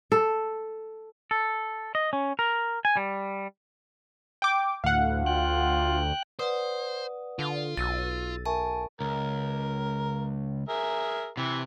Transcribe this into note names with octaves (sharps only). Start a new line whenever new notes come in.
A4
A4
D#5
C#4
A#4
G#5
G3
G5 D6
D2 A2 F5 F#5
F4 G5 F#6
B4 C5 D5 F#5 D#6
D3 F4
B1 E6 A6 D#7
A#4 E5 G#5 A5 C#6
C#2 A#4
G#4 A#4 E5
C3 E3